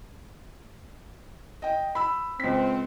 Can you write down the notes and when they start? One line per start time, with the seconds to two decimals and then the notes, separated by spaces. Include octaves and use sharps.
1.62 D#5 G5
1.95 B5 E6
2.40 C#2 C4 B6